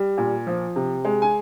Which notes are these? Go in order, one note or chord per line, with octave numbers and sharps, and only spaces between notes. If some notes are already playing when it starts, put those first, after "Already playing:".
Already playing: G3
A#2
F3
C3
G#3
G#5